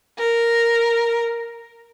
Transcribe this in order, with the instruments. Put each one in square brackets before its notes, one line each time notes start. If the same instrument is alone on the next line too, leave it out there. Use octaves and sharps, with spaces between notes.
[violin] A#4